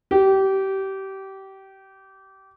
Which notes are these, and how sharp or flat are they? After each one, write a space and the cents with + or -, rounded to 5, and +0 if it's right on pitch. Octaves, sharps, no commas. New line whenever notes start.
G4 -25